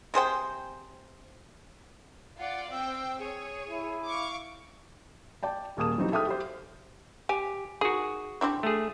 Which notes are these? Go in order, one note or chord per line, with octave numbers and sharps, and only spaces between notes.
C3 G#4 C5 G5
F4 D5 F#5
C4 G5 E6
G#4 C#5
E4
F5 C#6 D6
D5 G5 A5
D#1 A#3 G#4 A5 D#6 E7
E3 F#3 G3 C4 D#4
G#4 A4 E5 G5 D#6 F6
G4 C5
G4 G#5
D#3 F#4 G#4
C4 D4 E4
A3 G#4